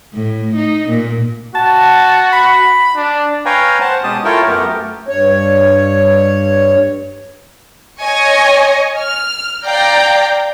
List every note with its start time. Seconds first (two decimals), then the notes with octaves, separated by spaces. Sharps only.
0.14 A2
0.56 D#4
0.89 A#2
1.55 F#4 A5
2.33 B5
2.95 D4
3.45 B4 C#5 F5 G5 G#5 A#5
3.81 C5 F#5 A5
4.04 B2 G#3 C#4 G4 A5 D#6
4.25 E4 F4 A4 A#4 C#5 G5
4.48 F#2 A3 B3 G4 A#4
4.73 A3
5.08 G2 C#5
8.00 C#5 D#5 G#5 C#6
8.98 F6
9.65 D5 F5 G5 A#5 G6